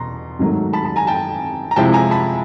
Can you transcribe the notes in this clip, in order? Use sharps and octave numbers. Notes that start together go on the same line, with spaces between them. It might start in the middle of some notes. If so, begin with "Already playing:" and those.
Already playing: E2 B2 A#5 C6
G#2 D#3 F#3 A3
A5 B5
A5 B5
G#5 A#5
G5 A5
A#5
C3 F3 G#3 C4 E4 G5 A5
G#5 A#5
A5 B5